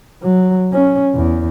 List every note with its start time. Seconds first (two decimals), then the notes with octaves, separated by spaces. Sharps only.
0.23 F#3
0.73 C#4
1.15 E2